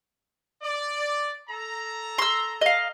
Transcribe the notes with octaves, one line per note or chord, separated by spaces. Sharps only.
D5
A4 A#5
C6 E6
D#5 F5